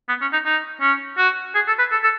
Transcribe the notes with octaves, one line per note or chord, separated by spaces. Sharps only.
B3
C#4
D#4
D#4
C#4
F#4
G#4
A4
B4
A4
A4